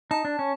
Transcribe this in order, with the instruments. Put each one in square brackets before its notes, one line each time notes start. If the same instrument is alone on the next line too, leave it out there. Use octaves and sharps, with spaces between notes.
[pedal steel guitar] D#4 [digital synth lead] A5
[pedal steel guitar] D4
C#4